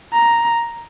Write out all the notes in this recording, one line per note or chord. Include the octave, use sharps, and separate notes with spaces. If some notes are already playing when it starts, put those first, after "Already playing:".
A#5